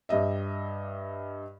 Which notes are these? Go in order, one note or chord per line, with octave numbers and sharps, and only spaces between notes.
G2 G4 D#5 E5